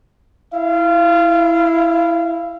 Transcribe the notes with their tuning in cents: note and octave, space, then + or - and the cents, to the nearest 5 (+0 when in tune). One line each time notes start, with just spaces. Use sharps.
E4 +0 F5 -25